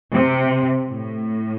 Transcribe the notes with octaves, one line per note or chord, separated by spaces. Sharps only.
C3
A2